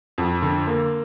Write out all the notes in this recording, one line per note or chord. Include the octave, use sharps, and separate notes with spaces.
F2
D3
A#3